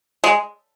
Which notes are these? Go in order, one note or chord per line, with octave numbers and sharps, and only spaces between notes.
G#3